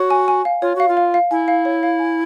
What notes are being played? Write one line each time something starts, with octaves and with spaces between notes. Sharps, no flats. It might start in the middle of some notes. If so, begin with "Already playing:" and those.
Already playing: F#4 C#5
G#5
G#5
F5
F4 C#5
F#4 F5
F4
F5
F5
E4 G#5
F5
C#5
F5
G#5